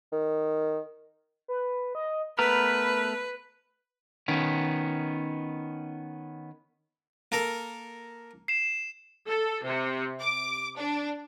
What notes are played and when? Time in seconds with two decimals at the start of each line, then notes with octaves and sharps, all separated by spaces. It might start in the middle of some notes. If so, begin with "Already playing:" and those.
0.12 D#3
1.48 B4
1.95 D#5
2.39 A3 B3 A#4 B4 B5
4.28 D#3 B3 C#4
7.32 A#3 A4 A#4
8.48 C7 E7
9.28 A4
9.65 C3
10.21 D6
10.78 D4